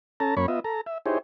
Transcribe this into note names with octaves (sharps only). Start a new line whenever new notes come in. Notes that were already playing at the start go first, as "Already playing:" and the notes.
C#4 A4 A5 A#5
F#2 A#3 C#4 C#5 B5 C#6
B3 F4 D#5 E5
A4 A#5
E5
D#4 E4 G4 G#4 C5 C#5